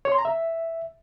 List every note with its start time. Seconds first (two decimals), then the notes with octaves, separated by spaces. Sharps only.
0.05 C#5
0.12 C6
0.18 A#5
0.25 E5